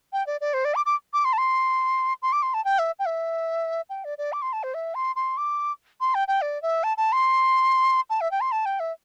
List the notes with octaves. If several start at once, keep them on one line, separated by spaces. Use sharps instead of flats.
G5
D5
D5
C5
D5
D6
D6
D6
C6
A5
C6
C6
D6
C6
A5
G5
E5
G5
E5
G5
D5
D5
D6
C6
A5
C5
E5
C6
C6
D6
C6
G5
G5
D5
E5
A5
A5
C6
A5
E5
G5
C6
A5
G5
E5